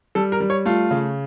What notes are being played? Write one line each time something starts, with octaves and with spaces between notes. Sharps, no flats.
G3 A4
A#4
G3
C#5
A3 F4
C#3